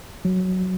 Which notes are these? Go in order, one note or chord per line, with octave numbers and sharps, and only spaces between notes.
F#3